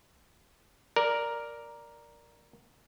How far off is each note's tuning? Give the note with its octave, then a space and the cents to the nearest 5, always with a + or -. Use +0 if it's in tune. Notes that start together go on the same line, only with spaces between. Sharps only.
A#4 +5 D5 +0